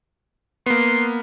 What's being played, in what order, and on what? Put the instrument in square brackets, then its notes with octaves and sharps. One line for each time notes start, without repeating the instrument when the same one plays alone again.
[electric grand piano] A#3 B3 [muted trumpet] C6